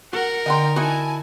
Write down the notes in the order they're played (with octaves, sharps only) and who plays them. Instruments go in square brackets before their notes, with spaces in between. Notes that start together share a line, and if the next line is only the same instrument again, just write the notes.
[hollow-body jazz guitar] F#4 [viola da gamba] A#4 [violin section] F#5
[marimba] D3 [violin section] D#4 G5 A#5 [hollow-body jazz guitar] D#5 F#5 C6
[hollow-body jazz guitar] D#4 E4 F#4 [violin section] G#5 A5